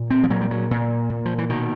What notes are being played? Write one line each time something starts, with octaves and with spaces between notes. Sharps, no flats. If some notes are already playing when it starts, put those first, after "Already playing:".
Already playing: A#2
C4
F3
A#2 F#3
G3
F#3
A#2
A#2
F3
E3
B2 D#3